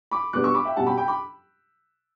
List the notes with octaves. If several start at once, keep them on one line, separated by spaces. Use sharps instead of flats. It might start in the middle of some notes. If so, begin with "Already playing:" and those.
B5 D6
B2 G3 B3 D4 D6 F#6
C#6 E6
B5 D6
E5 G5
B2 G3 C#4 F#5 A5
G5 B5
G5 B5
B5 D6